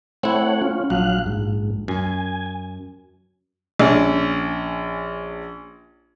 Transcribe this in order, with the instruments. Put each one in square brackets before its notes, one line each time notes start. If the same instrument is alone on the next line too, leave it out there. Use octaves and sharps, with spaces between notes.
[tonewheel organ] A3 C#5 F#5 [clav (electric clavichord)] C4 E4
[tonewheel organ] C#4 F4
[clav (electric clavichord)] A#1 [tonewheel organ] F#3 F5 F#6
[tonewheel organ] G#2
[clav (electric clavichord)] F#2 [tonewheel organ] G#5
[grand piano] A#1 C#4